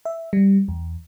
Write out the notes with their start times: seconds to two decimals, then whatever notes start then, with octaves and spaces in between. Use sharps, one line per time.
0.05 E5
0.33 G3
0.68 E2